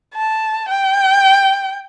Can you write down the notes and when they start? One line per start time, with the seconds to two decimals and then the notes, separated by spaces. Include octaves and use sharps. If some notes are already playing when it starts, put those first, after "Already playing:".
0.15 A5
0.69 G5